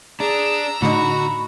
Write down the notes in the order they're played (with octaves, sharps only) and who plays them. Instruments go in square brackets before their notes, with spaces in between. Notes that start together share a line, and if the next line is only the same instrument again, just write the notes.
[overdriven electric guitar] D4 [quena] G#4 [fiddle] A#5 E6
[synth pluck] A2 D3 D#4 [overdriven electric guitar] F#4 [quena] B5